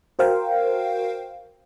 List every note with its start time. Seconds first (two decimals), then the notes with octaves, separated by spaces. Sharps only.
0.19 F#4 A#4 C5 F5 G5